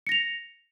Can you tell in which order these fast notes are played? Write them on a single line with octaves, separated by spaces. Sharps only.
C#7 A#6 F7